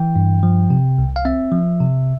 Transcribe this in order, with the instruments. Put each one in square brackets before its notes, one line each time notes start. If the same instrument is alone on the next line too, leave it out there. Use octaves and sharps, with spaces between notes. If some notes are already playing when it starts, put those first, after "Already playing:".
Already playing: [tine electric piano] E3 G5
G2
F3
C3
C2
F5
C4 E5
F3
C3